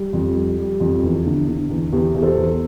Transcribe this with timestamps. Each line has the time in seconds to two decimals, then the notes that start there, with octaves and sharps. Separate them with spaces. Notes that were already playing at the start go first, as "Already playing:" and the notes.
Already playing: G3
0.13 F2
0.35 G3
0.57 G3
0.80 F2
1.03 E2
1.25 D3
1.48 D3
1.70 E2
1.93 E2 G4
2.15 E2
2.22 A4 C5
2.38 E2